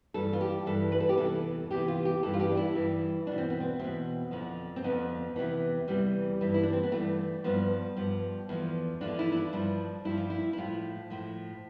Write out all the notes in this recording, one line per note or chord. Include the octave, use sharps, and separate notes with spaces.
G2 E3 A4
F4
G4
G2 E3 A4
B4
A4
G4
E2 C3 E3 A4
E2 C3 E3 G4
F4
G4
G2 E3 A4
F4
G4
D4
E4
G2 E3
E2 B2 D4
C4
B3
C4
E2 B2 C4
F2 D3 F3
C4
F2 D3 F3 B3
E2 C3 E3
E2 C3 E3 G3
G2 E3
E4
D4
C4
B3
G2 E3 A3
G2 F3 B3
G2 F3
E2 D3 F3
E2 D3 F3 D4
E4
E4
D4
G2 F3 D4
G2 F3 E4
F4
E4
E4
A2 F3 F4
A2 F3